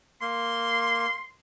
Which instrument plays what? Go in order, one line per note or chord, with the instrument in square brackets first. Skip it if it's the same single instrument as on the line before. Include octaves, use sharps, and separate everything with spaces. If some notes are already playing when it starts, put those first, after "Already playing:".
[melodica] A#3 [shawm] C6